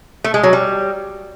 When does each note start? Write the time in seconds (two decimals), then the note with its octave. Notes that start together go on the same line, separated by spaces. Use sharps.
0.24 A3
0.34 G#3
0.43 F#3
0.53 G3